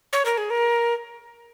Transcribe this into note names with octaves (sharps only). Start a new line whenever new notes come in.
C#5
A#4
G#4
A#4